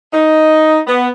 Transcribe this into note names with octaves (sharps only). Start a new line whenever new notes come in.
D#4
B3